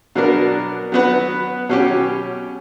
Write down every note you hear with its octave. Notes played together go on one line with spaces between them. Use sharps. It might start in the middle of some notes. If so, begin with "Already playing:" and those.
B2 F#3 B3 D4 A#4
F#3 B3 F#4 B4
B2 F#3 C#4 G4